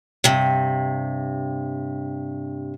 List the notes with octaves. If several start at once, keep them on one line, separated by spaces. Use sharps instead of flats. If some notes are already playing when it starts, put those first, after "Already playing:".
G2 C3